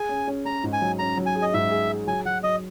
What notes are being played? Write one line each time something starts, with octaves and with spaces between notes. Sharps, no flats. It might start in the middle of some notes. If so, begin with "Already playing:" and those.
Already playing: G#4 G#5
C#4
C#4
C#4 A#5
G#2
G#5
F#3
C#4 A#5
F#3
G#5
G#4
D#5
G#2 E5
G#4
G#4
F#3 G#5
F#3 F#5
F#3 D#5